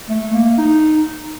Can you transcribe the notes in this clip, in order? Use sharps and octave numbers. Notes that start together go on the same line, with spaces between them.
A3
A#3
D#4